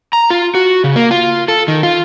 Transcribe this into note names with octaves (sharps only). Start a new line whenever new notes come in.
A#5
F4
F#4
C#3
A#3
F4
A4
D#3
F4